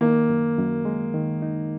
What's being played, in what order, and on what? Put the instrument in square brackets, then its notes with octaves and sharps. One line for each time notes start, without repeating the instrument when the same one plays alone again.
[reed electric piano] D#3 [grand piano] A#3
[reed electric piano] F#2
F#2
G#3
D#3
D#4